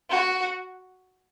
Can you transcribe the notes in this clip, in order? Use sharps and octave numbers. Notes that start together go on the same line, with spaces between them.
F#4